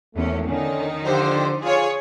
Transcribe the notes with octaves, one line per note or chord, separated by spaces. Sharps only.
G#1 E2 A3 C#4
D3 D#3 C#4 D#4
D3 F3 G4 C5
F4 G#4 C#5